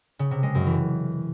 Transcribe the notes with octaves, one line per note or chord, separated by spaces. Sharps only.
C#3
C3
G#3
F#2
E3